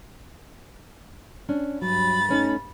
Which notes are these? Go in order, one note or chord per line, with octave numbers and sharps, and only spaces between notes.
C#4 D4
G2 F#3 B5 A6
A3 C#4 D#4